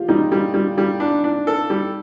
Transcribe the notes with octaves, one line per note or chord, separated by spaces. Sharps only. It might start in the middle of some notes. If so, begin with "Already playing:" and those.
Already playing: F4 G4
G3 D#4
G3
G3
G3
D4
D4
A4
G3